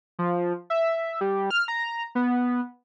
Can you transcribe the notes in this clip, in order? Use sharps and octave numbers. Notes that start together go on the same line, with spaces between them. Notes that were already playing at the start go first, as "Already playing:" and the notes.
F3
E5
G3
F6
A#5
B3